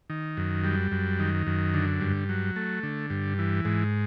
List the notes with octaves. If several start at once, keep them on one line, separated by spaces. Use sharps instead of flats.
D#3
F#2
G3
F#2
D#3
F#2
D3
G2
F#3
A3
D3
G2
E3
G#2